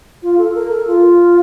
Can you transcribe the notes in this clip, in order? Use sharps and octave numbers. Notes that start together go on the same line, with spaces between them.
F4
A4
A#4
A4
F4